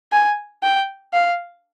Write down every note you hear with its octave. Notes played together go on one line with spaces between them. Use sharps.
G#5
G5
F5